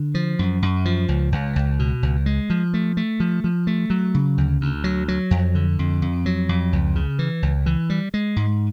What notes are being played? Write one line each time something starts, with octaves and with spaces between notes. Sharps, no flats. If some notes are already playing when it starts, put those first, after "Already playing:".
Already playing: D3
F3
F#2
F#2
F3
C#2
C#2
C#2
B2
C#2
G#3
F3
A3
A3
F3
F3
A3
F#3
C#3
D2
D2
F#3
F#3
F2
D3
F2
F2
F#3
F2
C#2
C#3
E3
C#2
E3
G3
G#3
G#2